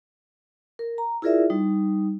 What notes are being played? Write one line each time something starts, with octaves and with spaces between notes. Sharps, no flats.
A#4
A#5
E4 F4 G#4 A#4 D5 E5
G3 D#4